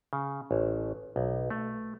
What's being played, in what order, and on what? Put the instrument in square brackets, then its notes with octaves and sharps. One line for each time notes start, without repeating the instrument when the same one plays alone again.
[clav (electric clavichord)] C#3
A1
B1
A3